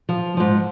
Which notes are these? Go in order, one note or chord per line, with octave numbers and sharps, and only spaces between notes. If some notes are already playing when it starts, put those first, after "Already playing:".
F3
G#2 F3